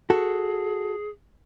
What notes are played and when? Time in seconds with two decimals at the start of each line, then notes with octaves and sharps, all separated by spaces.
0.10 F#4 G#4 A4